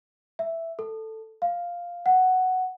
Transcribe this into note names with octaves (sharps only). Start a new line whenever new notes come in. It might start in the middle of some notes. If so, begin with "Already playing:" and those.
E5
A4
F5
F#5